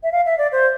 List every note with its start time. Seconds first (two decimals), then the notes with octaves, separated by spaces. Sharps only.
0.03 E5
0.12 F5
0.26 E5
0.38 D5
0.52 C5